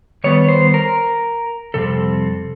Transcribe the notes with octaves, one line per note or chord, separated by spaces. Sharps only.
D#3 G3 B3 C#5
C5
A#4
F2 C3 G3 C4 A4